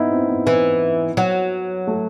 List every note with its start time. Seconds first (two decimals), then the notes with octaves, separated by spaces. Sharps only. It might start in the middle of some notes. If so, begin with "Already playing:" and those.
Already playing: B3 D#4 E4
0.10 C4
0.29 B3
0.47 E3
1.17 F#3
1.87 A3